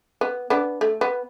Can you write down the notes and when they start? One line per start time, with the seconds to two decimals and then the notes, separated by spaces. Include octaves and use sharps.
0.21 B3
0.50 B3 D4
0.81 A3
1.01 B3